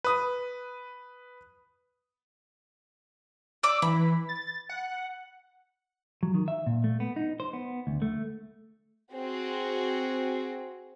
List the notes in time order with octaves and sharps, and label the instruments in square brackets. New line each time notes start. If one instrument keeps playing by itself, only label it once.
[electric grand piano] B4 D#6
[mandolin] D5 D6 [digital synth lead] E6
[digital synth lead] E3 [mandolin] B5
[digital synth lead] A6
F#5
[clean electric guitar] F#3
D#3
E5
A#2
A3
B3
D#4
C5
B3
D2
A3
[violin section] C4 F#4 G#4